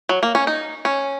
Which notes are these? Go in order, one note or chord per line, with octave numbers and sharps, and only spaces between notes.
F#3
A#3
C#4
D#4
C#4